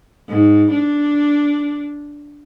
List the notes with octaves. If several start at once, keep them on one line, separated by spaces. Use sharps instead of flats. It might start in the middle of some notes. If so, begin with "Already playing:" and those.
G#2
D4